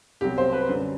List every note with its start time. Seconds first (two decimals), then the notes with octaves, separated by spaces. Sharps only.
0.21 C2 B2 F#3 G4
0.38 C5
0.53 B4
0.69 F#2 D3 G3